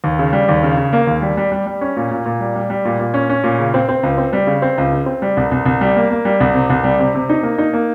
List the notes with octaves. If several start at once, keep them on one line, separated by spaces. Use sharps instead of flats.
D#2
C#3
G3
D#2
C#3
C#3
A#3
D#2
G3
G3
G3
G3
C#4
A#2
A#2
A#2
G3
G3
G3
A#2
A#2
C#4
C#4
A#2
C#3
C4
C4
C#2
C4
G3
C#3
C4
C#2
C#3
C4
G3
C2
C2
C2
G3
A#3
A#3
G3
C2
C3
C2
G3
C3
C3
D#4
A#3
D#4
A#3